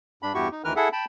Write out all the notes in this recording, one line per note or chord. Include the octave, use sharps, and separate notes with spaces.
G2 D4 B5
E2 G2 E4 F#4 G4 C#6
D#4
D2 D#3 E3 A#4 B4 F6
E4 G#4 A4 E5 F#5
G5 A5 B5